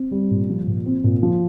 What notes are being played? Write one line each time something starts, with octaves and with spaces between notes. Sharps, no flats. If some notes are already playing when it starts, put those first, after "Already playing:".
Already playing: C4
G3
A#2
F3
A#2
C4
A#2
F3